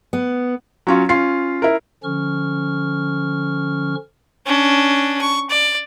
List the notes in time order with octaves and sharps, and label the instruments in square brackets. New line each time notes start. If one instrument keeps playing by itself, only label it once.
[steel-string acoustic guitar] B3
[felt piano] F#3 C#4 F4
C#4 F4 C7
E4 A#4
[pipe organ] D3 F3 C#4 C#6 F6
[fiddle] C#4 D4
C#6
D5